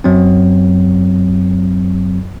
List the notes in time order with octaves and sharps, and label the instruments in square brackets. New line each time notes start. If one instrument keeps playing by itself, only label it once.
[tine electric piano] F#2 F#3 C4